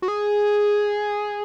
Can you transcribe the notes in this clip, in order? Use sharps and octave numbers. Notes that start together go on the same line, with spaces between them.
F#4
G#4